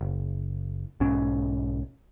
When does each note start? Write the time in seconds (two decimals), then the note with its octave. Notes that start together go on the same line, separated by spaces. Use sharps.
0.01 F#1
1.00 B1 G#2 C#4